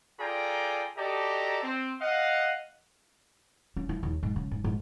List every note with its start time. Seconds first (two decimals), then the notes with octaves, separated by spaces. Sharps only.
0.20 F4 G#4 A4 D5 G5 A#5
0.97 F#4 G4 A4 D5 D#5 A#5
1.63 C4
2.01 D#5 F5 F#5
3.76 C#4
3.89 E4
4.03 D#2
4.23 G#2
4.36 C#3
4.51 G#2
4.64 G#2